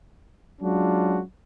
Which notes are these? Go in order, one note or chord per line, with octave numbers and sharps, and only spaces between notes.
F#3 G#3 C#4 D4 F4 F#4